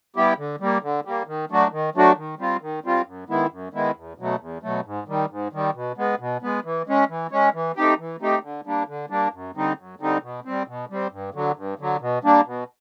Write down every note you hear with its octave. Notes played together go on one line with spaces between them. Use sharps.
G3 B3 E4 G4
D3
G3 A#3
D3
G3 A#3
D#3
F#3 A3 D4 F#4
D#3
F#3 A3 D4 F#4
D#3
G3 C4 F4
D#3
G3 C4 F4
F#2
D#3 G#3 B3 E4
F#2
D#3 G#3 B3 E4
E2
B2 F#3 A3
E2
B2 F#3 A3
G#2
D#3 G3
G#2
D#3 G3
B2
G#3 B3
B2
G#3 B3
E3
G#3 C#4
E3
G#3 C#4
E3
A3 C4 D#4 G4
E3
A3 C4 D#4 G4
D3
G3 A#3 D4
D3
G3 A#3 D4
F#2
D3 G3 C4 D#4
F#2
D3 G3 C4 D#4
B2
G3 C4
B2
G3 C4
G2
D3 F#3
G2
D3 F#3
B2
G3 A#3 D4
B2